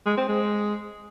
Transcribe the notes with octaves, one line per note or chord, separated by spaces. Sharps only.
G#3
C4
G#3